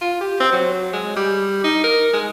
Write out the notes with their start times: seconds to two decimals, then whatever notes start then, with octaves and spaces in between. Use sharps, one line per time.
0.01 F4
0.21 G4
0.40 C4
0.52 F#3
0.93 G#3
1.17 G3
1.64 D#4
1.84 A#4
2.14 G#3